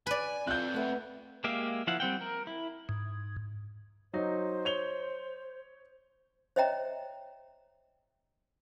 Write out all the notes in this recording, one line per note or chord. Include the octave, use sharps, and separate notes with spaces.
B4 D5 G#5
C4 F4 A4 F#6 G6
A3 B3 E5
G#3 A#3 G4 E5 F5
F3 E4 F5 F#5
G3 C4 F#5 G5
A#4
E4
G#2
F#3 D#4 C5
C#5 F7 G7
C5 C#5 D#5 E5 G5 A#5